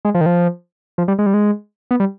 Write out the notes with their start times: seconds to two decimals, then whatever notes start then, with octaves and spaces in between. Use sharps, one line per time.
0.05 G#3
0.15 F3
0.21 D#3
0.26 F3
0.98 F3
1.08 G3
1.19 G#3
1.26 G3
1.34 G#3
1.91 B3
2.00 G3